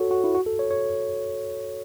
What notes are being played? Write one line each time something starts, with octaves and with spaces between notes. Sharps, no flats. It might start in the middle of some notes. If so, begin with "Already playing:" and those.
Already playing: F#4 A4 C#5
F#4
E4
F#4
A4
C#5
C#5